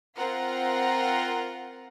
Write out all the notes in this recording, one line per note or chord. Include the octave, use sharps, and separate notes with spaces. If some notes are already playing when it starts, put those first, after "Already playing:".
C4 F4 A#4 F#5 A#5